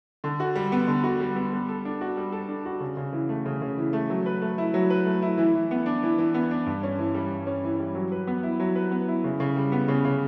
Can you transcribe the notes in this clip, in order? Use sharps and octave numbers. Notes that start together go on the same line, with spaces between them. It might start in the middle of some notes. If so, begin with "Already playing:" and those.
D3
F#4
G3
B3
D3
F#4
G3
B3
G3
A4
D4
F#4
G3
A4
D4
F#4
C#3
C#3
E3
A3
C#3
C#3
E3
A3
F#3
B4
A3
E4
F#3
B4
A3
E4
E3
E3
B3
D4
E3
E3
B3
D4
G2
C#4
E3
G3
G2
C#4
E3
G3
F#3
B4
B3
E4
F#3
B4
B3
E4
C#3
C#3
G3
B3
C#3
C#3